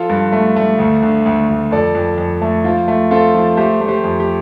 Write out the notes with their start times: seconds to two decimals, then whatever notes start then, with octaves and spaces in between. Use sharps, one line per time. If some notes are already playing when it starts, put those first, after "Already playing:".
Already playing: F3 F4 A4
0.10 G2
0.32 A3
0.56 A3
0.78 D2
1.02 D3
1.26 D2
1.49 D2
1.71 F2 A4 D5
1.95 F2
2.18 F2
2.42 A3
2.64 F3 F4
2.88 A3
3.11 C4 F4 A4
3.35 F3
3.57 A3 G4 C5
3.81 A3
3.88 G4 C5
4.04 F2
4.20 G4